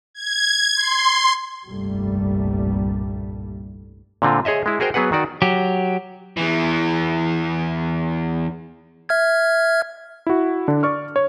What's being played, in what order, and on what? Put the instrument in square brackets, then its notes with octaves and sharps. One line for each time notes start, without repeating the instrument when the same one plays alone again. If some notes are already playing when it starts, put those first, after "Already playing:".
[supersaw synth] G#6
C6
[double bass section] F1 C2 G2 A#2 G3 A3
[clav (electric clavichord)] A#2 D3 C4 F4
G#4 C#5 D#5 E5
G#3 E4
F#4 G#4 A#4 C5 G5
F#3 B3 G#4 B4 F#5
D#3 F#4 D5
[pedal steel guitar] F#3 G4
[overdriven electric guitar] E2 E3
[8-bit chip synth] E5 F6 G#6
[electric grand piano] E4 F#4
D3 D4
D5 C#6 F6
C#5